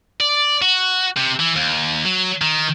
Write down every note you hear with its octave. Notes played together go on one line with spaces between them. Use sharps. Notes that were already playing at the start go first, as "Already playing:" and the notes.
D5
F#4
C3
E3
D#2
F#3
D#3